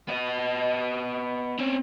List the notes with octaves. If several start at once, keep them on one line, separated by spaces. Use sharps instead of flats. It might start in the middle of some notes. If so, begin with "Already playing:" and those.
B3 D#5
C4 C#4